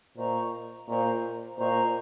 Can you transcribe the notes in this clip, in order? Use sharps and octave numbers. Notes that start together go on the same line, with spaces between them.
A#2 C5 D#5 A#5 C#6
A#2 C5 D#5 A#5 C#6
A#2 C5 D#5 A#5 C#6